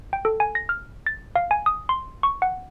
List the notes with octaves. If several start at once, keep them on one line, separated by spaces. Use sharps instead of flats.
G5
A4
G#5
A#6
F6
A6
F5
G#5
D#6
C6
C#6
F#5